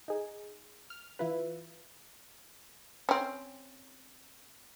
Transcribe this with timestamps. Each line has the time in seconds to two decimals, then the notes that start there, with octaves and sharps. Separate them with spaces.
0.08 D#4 G#4
0.90 F6
1.19 E3 E4 F4 B4
3.09 C4 C#4